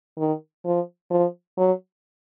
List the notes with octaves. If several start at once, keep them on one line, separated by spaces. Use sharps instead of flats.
D#3
F3
F3
F#3